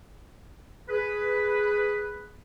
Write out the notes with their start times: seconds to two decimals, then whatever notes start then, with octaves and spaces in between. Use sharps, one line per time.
0.89 G#4 B4